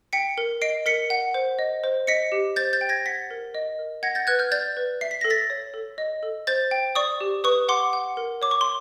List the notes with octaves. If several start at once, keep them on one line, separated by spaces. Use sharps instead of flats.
G5 B6 C#7
A#4
D#5 C7 D7
A#4 B6 C#7
F#5
C5
D#5
C5
D#5 B6 C#7
G4
C5 G6 A6
G6 A6
G5
G#6 A#6
F#5 A6 B6
A#4
D#5
A#4
F#5 G#6 A#6
G6 A6
B4 F#6 G#6
F6 G6
D5 G6 A6
B4
E5 C7
B6
A4 A#6
A6 B6
C#5
A4
D#5
A4
C5 G6 A6
G5
D5 C#6 D#6
G4
B4 C#6 D#6
F#5 C6 D6
F#5
A#4
C#5 D6
C#6
C6